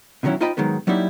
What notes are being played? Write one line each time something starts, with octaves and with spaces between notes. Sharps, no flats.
B2 D3 D#3 F#3 C#4 E4
D#4 F4 C5 D#5 G5 B5
G#2 D#3 F#3 G#3 B3
F#3 G3 A#3 D#4 E4